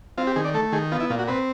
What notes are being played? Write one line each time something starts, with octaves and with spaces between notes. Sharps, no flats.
C4 F4
G4
D#3 G#4
D5
A3 A4
D#3 G#4
B3 F4
E4
A#2 F4
F#4
C4 B4